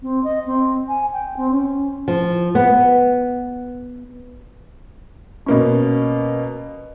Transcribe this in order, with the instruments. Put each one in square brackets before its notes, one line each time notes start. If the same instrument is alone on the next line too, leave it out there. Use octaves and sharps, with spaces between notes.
[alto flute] C4
D#5
C4
G#5
G5
C4
C#4
[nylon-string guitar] F3
B3
[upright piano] B2 A#3 C#4